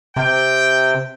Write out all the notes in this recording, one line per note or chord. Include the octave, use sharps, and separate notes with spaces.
C3 G5